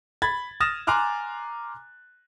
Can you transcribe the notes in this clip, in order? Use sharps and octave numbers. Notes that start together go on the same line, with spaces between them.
B5 G#6 A6
D#6 F6 A6 A#6 E7
G#5 A#5 C6 D6 F6 F#6